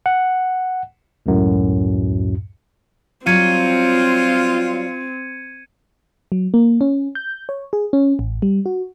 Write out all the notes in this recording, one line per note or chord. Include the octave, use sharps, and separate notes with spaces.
F#5
C#2 F#2 A2
F#3 G3 C4 F4 G#6 C#7 D#7
F#3
A#3
C#4
G6
C#5
G#4
C#4
A1
G3
F#4